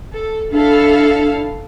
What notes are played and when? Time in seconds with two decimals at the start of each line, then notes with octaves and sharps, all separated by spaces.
0.13 A4
0.52 D4 E4 A4 F5